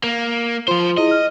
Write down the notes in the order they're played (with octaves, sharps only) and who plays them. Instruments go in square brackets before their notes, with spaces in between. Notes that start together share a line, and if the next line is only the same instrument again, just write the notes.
[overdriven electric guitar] A#3
[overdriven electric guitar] F3 C5 [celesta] F4 C6
[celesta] E4 G#4 [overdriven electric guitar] D#5
[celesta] F6